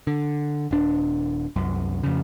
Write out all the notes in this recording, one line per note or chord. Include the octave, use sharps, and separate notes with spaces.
D3
D#1 D4
C2 F#2
F2 C#3